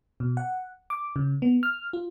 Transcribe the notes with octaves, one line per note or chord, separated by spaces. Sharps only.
B2
F#5
D6
C#3
B3
F6
F4